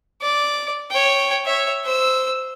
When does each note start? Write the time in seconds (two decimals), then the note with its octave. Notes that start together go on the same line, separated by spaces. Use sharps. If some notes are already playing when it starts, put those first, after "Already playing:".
0.21 D5
0.90 C#5 G5
1.45 C#5 E5
1.84 C5 E6